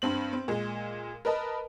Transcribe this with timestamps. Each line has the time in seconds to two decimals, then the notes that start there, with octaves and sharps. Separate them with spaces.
0.02 G2 C4 F#7
0.33 C4
0.48 A#2 G#3
1.25 A#4 B4 D#5 A5